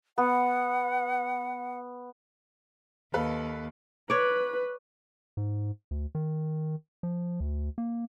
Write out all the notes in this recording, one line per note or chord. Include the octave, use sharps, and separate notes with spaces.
B3 F#5
D#2 A4 B4 F5
B4 C#5 D5
G#2
D2
D#3
F3
D2
A#3